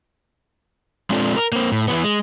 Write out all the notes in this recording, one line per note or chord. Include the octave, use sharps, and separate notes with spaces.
G#3 C4 D4 F4 G#4 A4
A#4
A#3 C4
A2
E3 F3 B3
G#3